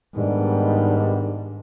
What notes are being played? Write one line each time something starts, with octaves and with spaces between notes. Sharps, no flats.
G#2 D#3 G3 B3 D4